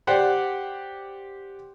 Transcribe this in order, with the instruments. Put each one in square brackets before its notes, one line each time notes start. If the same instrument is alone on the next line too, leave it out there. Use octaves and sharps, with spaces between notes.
[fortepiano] G4 C5 D5 F#5